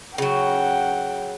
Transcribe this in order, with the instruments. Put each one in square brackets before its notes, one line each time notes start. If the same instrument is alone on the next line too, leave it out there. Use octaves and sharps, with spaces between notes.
[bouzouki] C#3 F#3 [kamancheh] F#5 G5